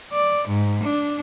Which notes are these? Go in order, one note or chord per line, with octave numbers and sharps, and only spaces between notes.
D5
G#2
D4